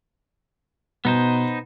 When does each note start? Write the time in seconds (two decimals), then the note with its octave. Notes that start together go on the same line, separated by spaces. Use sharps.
1.05 B2 B3 D#4 C5